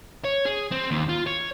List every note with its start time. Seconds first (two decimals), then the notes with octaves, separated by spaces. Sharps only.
0.25 C#5
0.46 G#4
0.72 C4
0.91 D#2
1.09 F4
1.27 C#5